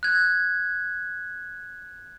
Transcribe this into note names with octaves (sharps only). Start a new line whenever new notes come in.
F#6 G#6